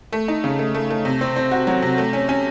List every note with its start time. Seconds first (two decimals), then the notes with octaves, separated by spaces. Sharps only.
0.13 A3
0.28 D#4
0.44 C#3
0.59 A3
0.75 A3
0.90 A3
1.05 C3
1.21 C4
1.36 C4
1.52 F#4
1.67 F#3
1.82 C3
1.98 A3
2.13 C#4
2.29 C#4